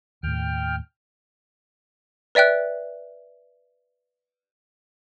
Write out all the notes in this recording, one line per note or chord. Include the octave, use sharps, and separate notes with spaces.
D#2 A2 G5 F6
B4 D5 E5 G5 F#6